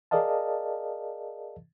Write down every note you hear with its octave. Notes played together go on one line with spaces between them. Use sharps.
G#4 A#4 D5 D#5 F5 A5